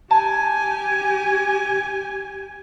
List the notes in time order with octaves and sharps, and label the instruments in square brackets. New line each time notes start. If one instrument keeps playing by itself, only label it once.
[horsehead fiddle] G4 G#5 [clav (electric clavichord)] A5